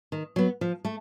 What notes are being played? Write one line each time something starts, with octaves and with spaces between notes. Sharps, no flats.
D#3
F#3 B3
F3
A3